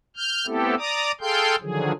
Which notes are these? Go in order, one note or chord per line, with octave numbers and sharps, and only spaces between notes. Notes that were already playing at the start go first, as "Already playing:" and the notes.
F6 G6
A3 B3 C4 E4 G4 A4
D5 A#5 D6 D#6
G#4 A4 F5 G5 C6 G6
D3 D#3 F3 F#3 G#4